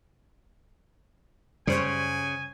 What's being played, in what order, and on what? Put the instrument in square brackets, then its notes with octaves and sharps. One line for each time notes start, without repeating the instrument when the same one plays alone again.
[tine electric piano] F#2 [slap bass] C#3 [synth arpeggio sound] G3 C5 C#5 [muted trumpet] G#5